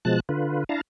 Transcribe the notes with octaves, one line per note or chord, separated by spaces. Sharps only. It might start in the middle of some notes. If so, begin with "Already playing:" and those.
B2 F3 G#3 A5 F#6
D3 F4 B4
D4 E4 F5 A5 A#5